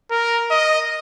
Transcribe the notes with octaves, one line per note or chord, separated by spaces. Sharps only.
A#4
D#5